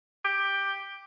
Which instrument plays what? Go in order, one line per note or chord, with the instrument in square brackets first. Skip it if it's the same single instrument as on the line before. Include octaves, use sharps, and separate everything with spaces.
[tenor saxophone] G4